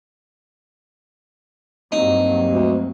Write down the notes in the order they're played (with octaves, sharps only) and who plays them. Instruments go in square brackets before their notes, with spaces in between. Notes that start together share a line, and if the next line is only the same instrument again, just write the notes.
[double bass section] G2 F#3 A#3 [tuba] C4 [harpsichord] D#4
[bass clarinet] D2